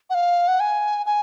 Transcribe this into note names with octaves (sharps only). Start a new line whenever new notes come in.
F#5
F5
F#5
G#5
G#5